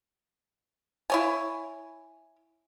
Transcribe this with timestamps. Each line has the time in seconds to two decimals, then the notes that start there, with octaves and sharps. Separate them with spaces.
1.10 E4 C#5 G#5